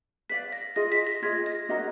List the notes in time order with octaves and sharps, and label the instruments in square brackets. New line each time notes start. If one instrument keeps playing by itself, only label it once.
[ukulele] B4 D5 F5 [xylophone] B6
[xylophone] A#6
[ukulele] F4 G#4 D#5 [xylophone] A#6
[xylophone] B6
A#6
[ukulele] F4 G#4 D#5 [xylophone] G#6
[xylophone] A#6
[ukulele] D4 F#4 A#4 D#5